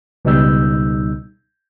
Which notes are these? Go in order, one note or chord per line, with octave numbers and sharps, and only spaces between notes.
C#2 B2 G3 D#4 E6 G6